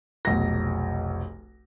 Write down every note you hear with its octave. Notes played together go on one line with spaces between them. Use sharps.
F1 B1 A#6